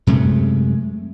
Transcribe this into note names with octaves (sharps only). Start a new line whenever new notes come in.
F#2 C3 G#3 A3